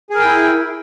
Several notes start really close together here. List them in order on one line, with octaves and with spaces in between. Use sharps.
G#4 A#4 G5 E4